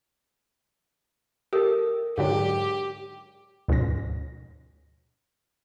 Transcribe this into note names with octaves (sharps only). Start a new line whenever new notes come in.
G4 A4 A#4 E5 D#6
G#2 D3 F#3 G4
D2 G#2 B2 F3 C#4 A#6